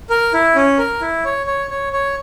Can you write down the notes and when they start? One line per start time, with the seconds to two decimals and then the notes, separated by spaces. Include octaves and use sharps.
0.10 A#4
0.33 E4
0.55 C#4
0.78 A#4
1.01 E4
1.25 C#5
1.46 C#5
1.70 C#5
1.93 C#5